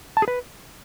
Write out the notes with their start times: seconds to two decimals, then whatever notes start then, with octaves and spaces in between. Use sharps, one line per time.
0.17 A5
0.22 G#4
0.28 B4